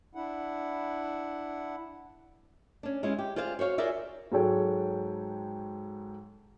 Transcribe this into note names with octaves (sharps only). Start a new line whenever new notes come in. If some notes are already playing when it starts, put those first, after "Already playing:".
D4 E4 F#5
C#4 D4
G#3 C#4 E4 F4
G4
F4 G#4 C5 D5 F5
F#4 C5 C#5 F5
F4 F#4 G#4 A#4 D5 E5
G#2 F#3 G#3 A4 C#5 G5